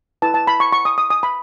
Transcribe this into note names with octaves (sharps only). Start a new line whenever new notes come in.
E4 B4 A5
A5
B5
C#6
C#6
D#6
D#6
D#6
B5